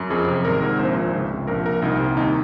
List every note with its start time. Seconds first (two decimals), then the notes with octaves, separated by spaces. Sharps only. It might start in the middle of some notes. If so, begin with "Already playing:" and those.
Already playing: F#2
0.10 F2 G#4
0.28 C3
0.44 G#1 A#4
0.62 G#2
0.79 A#1 C5
0.96 A#2
1.13 C#2
1.31 C3
1.47 A#1 A#4
1.65 A#2 A#4
1.82 C2 D#4
1.99 C3
2.17 D#2 D#4